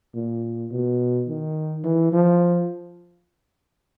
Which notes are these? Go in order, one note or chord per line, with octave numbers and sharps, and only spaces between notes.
A#2
B2
D#3
E3
F3